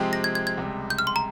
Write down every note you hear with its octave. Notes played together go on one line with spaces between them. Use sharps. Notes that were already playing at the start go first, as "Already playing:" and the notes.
Already playing: C3 F3 G#3 C4 G4
A#6
G#6
G#6
G#6
C#2 C3 G3
G6
F6
C6
A#5